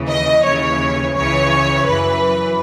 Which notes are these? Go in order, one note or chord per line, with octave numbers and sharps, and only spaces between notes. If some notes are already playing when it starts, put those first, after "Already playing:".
Already playing: D#2 C#3 E3
D#5
D#2 C#3 E3 C#5
C#2 C#3 E3 C#5
F#2 E3 B4